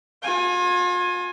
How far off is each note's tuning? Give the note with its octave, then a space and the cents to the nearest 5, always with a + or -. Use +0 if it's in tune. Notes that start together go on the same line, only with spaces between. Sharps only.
F4 +40 G#5 +0